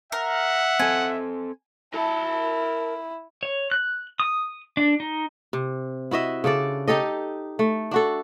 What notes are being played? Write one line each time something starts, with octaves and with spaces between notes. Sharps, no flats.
A#4 E5 F#5
C4 A4 G#5
E4 A#4 A5
C#5
F#6
D#6
D4
D#4
C3
E4 F#4 D#5 E5
C#3 D4 A4 D5
D#4 G4 A4 D#5
A3
D4 F#4 A4